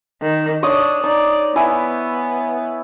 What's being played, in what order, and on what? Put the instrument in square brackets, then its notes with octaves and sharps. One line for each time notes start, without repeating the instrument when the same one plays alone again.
[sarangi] D#3
[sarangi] D4 [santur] C#5 D#6
[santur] D#4 [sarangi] D5
[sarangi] B3 [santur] E4 G#5